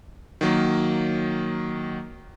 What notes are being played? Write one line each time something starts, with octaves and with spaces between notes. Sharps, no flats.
D#3 F#3 A#3